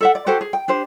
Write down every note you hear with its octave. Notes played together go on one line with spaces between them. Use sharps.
A4 E5 F#5
D5
F#4 G4 A4 C5
G#4
G5
D4 G4 C5